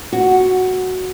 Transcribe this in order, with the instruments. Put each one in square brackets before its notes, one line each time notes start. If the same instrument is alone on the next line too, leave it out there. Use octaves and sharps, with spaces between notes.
[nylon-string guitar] F#4